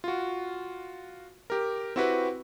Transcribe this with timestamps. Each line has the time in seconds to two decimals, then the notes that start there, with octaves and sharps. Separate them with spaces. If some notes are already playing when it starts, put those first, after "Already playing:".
0.04 F4 F#4
1.50 G4 A#4
1.96 C4 E4 F#4 G4 B4